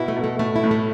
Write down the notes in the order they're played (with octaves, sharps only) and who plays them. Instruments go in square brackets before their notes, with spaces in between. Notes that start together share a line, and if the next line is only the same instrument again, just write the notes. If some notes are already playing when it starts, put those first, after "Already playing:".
Already playing: [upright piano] B2 [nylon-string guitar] E4
[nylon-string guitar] A3
[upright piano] B2
[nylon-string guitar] A3
[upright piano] A2 [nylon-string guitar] A3
[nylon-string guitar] E4
[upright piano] A2
[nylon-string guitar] A3